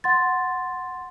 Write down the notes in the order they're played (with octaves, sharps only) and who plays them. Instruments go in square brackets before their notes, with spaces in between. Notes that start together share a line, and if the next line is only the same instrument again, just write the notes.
[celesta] F#5 C6 A6